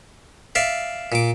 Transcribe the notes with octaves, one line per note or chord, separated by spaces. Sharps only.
D5 E5 F5
A#2 D6